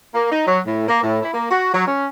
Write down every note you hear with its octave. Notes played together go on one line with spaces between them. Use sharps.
A#3
D#4
F#3
A2
A#3
A2
E4
A#3
F#4
F#3
C#4